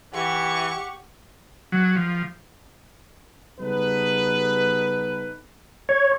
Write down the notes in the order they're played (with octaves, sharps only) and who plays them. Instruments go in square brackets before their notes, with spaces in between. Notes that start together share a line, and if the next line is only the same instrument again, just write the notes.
[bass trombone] E3 [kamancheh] G4 F#5 [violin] C#6
[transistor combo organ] F#3
F3
[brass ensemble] C#3 G3 B3 D#4 A4 B4
[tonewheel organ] C#5